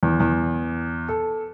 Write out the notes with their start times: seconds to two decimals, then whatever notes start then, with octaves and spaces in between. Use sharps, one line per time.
0.03 E2
0.20 E2
1.08 A4